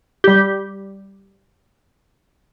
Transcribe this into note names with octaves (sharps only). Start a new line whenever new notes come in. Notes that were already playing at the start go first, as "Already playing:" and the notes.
G3 G4